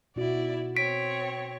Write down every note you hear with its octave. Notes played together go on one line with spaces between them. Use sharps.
B2 D#4 E4 F#4 D5
C4 C#5 B6 D7